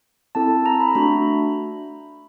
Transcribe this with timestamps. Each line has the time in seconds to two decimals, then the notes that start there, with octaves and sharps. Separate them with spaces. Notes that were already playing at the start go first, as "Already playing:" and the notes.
0.35 C4 E4 A4 A5
0.66 A#5
0.80 B5
0.95 A3 D4 F#4 B5